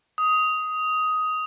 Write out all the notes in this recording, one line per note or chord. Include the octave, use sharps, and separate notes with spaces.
D#6